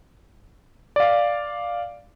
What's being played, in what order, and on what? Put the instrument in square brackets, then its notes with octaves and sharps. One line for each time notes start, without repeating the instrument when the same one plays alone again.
[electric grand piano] D5 F5